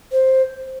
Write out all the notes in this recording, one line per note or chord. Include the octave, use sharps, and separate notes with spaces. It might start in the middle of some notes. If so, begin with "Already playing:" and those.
C5